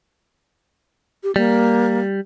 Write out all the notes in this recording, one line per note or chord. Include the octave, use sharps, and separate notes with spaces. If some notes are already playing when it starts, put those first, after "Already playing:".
G4
G3 A#3